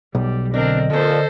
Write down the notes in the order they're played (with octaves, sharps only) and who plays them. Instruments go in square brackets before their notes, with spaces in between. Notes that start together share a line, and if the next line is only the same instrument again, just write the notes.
[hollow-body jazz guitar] B1 [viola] G3
[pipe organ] D3 D#5 [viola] C4 A#4 [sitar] D4
[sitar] A#2 F3 [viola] A4 C5